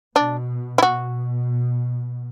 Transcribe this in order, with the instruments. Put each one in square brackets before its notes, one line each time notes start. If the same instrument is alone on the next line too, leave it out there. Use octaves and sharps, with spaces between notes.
[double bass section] B2 [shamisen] D4
[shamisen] E4
[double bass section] B2 [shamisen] F#4